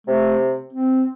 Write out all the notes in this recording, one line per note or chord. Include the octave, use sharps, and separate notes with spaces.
C3 A3
C4